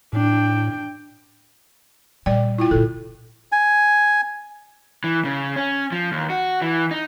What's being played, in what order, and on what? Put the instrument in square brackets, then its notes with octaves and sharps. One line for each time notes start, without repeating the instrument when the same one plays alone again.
[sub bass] A2 [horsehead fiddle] D4 G5
[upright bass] A#2 [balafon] G3 D5 G5
[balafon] E4 F4 G5
[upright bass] A#2 E4 [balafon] A4
[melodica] G#5
[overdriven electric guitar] E3
C#3
C#4
F3
D#2
F#4
E3
D#4